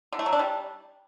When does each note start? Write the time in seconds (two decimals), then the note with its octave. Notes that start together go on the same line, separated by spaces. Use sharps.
0.13 D3
0.19 A3
0.26 F#3
0.33 D4
0.39 G3